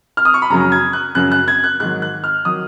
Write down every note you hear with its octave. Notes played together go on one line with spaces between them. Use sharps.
F6
D#6
C#6
B5
F#2 C#3 F#3 A#5
G#6
F#6
F#2 C#3 F#3 F#6
F#6
G#6
F#6
G#2 D#3 F#3 F#6
F#6
F6
D#3 F#3 D#6